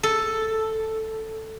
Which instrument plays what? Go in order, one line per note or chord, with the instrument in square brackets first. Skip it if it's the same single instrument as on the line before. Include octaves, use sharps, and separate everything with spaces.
[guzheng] A4